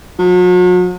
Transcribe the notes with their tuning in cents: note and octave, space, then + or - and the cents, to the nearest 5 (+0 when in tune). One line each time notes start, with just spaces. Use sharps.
F#3 -40